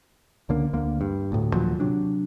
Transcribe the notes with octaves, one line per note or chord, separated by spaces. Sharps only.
C#2 D3 A#3
D2 D3 A#3
G2
D2 A2
D#2 A#2 F3 F#3
C3 F#3 D4